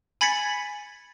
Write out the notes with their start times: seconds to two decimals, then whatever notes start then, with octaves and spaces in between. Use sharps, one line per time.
0.21 G#5 B5 G#6 A6 B6 C#7